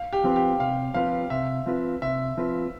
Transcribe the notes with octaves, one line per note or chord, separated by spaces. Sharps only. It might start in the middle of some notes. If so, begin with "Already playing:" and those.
Already playing: F5
G4
F3 C4 F4 B4
G4
C3 F5
F3 C4 F4 B4 F5
C3 E5
F3 C4 F4 B4
C3 E5
F3 C4 F4 B4